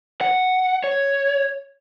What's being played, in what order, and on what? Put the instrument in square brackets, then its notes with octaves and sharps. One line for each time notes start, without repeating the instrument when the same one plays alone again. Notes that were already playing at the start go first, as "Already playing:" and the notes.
[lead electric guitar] F#5
C#5